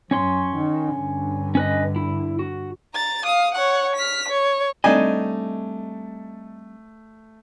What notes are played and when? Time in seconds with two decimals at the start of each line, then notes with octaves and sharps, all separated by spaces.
0.11 F#2 C#4 C#5 C6
0.57 D#3
0.94 G2 D3
1.55 C#4 B4 D#5
1.96 E4
2.39 F#4
2.95 A#5 A6
3.25 F5 D#6
3.54 C#5 F#5
3.95 F6 B6
4.29 C#5
4.84 G3 A3 C4 D4 D#4 D#5 G#5